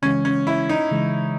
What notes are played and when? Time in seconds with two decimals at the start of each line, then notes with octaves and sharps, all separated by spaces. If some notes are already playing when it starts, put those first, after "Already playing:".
0.02 C#3 E3 G#3 C#4
0.25 C#4
0.47 E4
0.69 D#4
0.91 C#3 E3 G#3